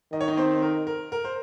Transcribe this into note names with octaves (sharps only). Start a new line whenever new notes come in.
D#3 D#5
C#5
D#4 D#5
C4 C5
A#4
A#4
A#4
C5